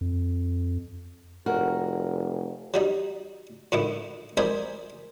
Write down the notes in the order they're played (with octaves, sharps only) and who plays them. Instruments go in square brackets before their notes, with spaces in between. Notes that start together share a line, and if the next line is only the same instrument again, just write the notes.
[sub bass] F2
[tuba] F1 [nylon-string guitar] F#4 A#4
[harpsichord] F#3 G3 D#4
A2 D3 D#3 E4
A#4 C5 D5 D#5 G#5 B5